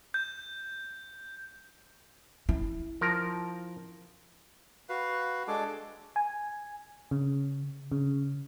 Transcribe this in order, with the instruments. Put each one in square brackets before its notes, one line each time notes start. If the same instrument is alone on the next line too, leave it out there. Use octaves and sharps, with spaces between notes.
[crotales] G6
[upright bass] E4
[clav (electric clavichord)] F3 A#4
[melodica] F#4 B4 F5
G#3 D4 A4 D6
[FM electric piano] G#5
C#3
C#3